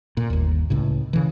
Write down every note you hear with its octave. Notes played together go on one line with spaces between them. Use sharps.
A#2
G1 D#2
C#2 A2 C#3
C#3 E3